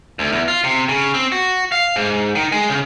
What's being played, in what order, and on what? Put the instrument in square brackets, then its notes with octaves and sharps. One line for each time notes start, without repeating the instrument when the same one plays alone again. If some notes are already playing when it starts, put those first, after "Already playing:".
[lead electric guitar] D2
E2
F4
C3
C#3
C4
F#4
F5
G#2
D#3
G#3
C#3